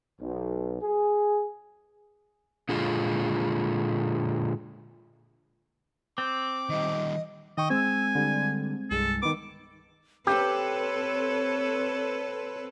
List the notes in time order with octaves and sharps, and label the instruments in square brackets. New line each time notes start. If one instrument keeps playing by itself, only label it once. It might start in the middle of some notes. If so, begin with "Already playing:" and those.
[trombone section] B1
G#4
[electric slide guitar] A#2 D3 G#3 F4
[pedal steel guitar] C4 [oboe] D6
[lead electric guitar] D#3 G3 [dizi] D#5
[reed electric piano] D#3 G5 C#6 [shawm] D#5
[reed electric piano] G#3 C4 [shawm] G#5 [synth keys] E6
[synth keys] D3 G3
[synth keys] C2 G2 G#3 [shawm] A4
[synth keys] D#3 B3 [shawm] D6
[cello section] C4 A4 B4 [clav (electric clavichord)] G4 [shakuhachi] C#5